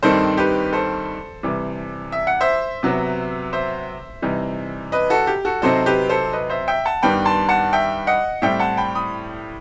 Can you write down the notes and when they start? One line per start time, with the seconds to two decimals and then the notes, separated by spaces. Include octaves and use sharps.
0.03 G2 D#3 G3 C4 D#4 A4 C5
0.37 G4 B4
0.73 A4 C5
1.43 C3 E3 G3
2.12 E5
2.27 F#5
2.41 C5 E5
2.83 C3 F#3 B3
3.53 C5 E5
4.22 C3 E3 G3 D#4
4.92 B4 D#5
5.10 F#4 A4
5.27 G4
5.45 F#4 A4
5.62 C3 F#3 C4 D#4 A4 C5
5.86 G4 B4
6.09 A4 C5
6.33 B4 D#5
6.49 C5 E5
6.68 E5 G5
6.85 F#5 A5
7.02 G2 D#3 G3 B3 G5 B5
7.25 A5 C6
7.49 F#5 A5
7.73 E5 G5
8.07 D#5 F#5
8.42 A2 G3 C4 E5 G5
8.59 F#5 A5
8.77 G5 B5
8.95 B5 D#6